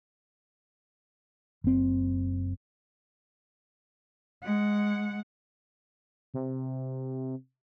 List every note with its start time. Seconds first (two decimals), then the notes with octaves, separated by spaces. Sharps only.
1.64 F#1 C4
4.44 G#3 F#5
6.34 C3